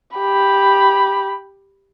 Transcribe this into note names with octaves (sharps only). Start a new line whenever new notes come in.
G4 B5